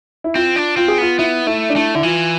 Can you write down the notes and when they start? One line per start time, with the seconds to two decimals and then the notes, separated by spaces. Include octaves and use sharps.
0.24 E4
0.35 C4 F4
0.56 D4
0.77 C4 F4
0.88 G#4
0.98 B3 F4
1.19 B3 E4
1.47 A3 E4
1.70 D4
1.75 A3 E4
1.95 D3 E4
2.03 E3 F4